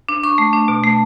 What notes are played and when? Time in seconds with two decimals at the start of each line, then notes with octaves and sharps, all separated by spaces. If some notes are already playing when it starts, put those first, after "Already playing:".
0.09 D4
0.23 D4 C#6
0.38 A3
0.53 D4
0.68 B2
0.84 A3